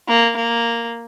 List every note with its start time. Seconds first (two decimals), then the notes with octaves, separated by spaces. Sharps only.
0.08 A#3
0.36 A#3